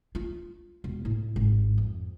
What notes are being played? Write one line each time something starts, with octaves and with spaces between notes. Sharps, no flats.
F4
E1
A2
G#1
F2